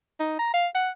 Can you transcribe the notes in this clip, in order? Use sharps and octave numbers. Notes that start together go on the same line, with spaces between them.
D#4
A#5
F5
F#5